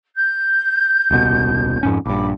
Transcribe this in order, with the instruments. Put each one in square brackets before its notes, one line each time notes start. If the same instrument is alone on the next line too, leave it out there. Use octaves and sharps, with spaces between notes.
[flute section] G6
[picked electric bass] D#1 C2 B2
F2 G#2 C#4
[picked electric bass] A#1 G2 [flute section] B5 D6